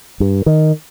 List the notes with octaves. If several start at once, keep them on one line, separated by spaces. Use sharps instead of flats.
G2
D#3